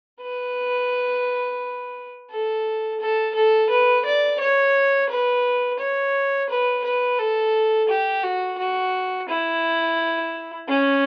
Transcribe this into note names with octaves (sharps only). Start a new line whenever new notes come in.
B4
A4
A4
A4
B4
D5
C#5
B4
C#5
B4
B4
A4
G4
F#4
F#4
E4
C#4